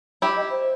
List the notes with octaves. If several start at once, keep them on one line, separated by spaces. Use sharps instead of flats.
E4 G4 G5
D#5
C5